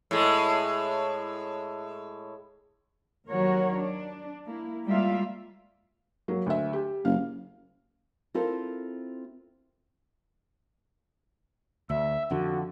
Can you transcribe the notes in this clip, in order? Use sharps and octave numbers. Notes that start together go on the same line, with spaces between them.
A2 G#3
D#2 F#3 F#4 A#4 C#5
D4
A#3 E4
G3 G#3 A#3 F4 E5 F5
F#3 A#3
D2 E5
G4
F#1 F5
C4 E4 F4 A4 A#4 C5
D2 E5
F2 D3 F#4